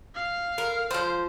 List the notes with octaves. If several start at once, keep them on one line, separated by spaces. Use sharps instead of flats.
F5
A#4
F3 C5